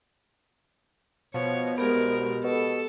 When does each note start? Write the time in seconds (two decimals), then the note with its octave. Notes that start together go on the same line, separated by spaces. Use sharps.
1.34 B2 F3 C#5
1.78 C2 G#3 B3 G4 G#4 A#4
2.44 B2 A4